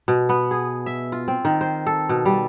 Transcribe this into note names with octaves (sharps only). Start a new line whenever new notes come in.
B2
B3
G#4
E5
F4
C4
D#3
C5
A4
B2
G3